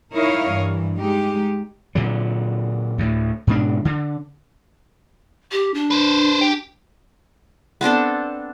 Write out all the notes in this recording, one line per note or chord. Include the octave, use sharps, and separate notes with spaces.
D#4 E4 A#4 C#5 D#5 F5
G2 E3
G#3 D#4 G4
A#2 D3 F#3
D2 A2
G#2 B2 D4
D3
G4
D4
B4 C5
G4
B3 C4 D4 A4